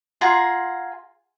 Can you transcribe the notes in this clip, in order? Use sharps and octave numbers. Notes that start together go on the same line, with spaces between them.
F4 G#4 F#5 A#5